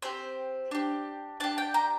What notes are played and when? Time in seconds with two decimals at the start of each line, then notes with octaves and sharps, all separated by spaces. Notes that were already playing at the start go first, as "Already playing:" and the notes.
0.02 C4 G4 C5
0.71 D4 G4
1.40 D4 G4 A5
1.58 G5
1.74 A#5